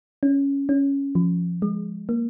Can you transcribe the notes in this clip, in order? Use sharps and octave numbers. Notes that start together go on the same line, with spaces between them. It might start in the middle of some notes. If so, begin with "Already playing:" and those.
C#4
C#4
F3
G#3
A#3